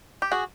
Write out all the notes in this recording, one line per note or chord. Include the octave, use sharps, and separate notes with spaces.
G4
F#4 G#4